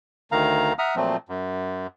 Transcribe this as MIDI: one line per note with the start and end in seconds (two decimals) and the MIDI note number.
0.32 0.73 38
0.32 0.73 51
0.32 0.73 77
0.32 0.73 82
0.79 0.95 76
0.79 0.95 78
0.79 0.95 82
0.79 0.95 87
0.79 0.95 89
0.96 1.17 46
0.96 1.17 53
0.96 1.17 54
0.96 1.17 57
0.96 1.17 60
1.29 1.87 42